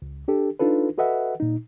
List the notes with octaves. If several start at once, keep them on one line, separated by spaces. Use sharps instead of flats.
C#2
D4 G4 A4
D4 D#4 F4 A4 B4
F#4 A4 B4 D#5 E5 F#5
A#2 D#4